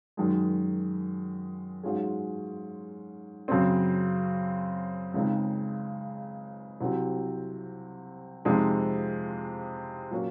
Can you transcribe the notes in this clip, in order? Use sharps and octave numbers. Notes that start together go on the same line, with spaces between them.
F#2 D#3 G#3
G#2 F#3 C#4 F4 G#4
F#2 C#3 F#3 C4
C#2 C#3 G#3 C4 D#4
C2 C3 F#3 C4
F2 C3 F3 G#3 D#4
A#2 F#3 A#3 C#4